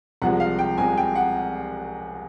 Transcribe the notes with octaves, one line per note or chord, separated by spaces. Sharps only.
C2 C3 F3 G#3 F#5
F5
G5
C2 C3 F3 G#3 G#5
G5
F#5